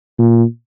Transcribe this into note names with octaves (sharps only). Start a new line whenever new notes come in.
A#2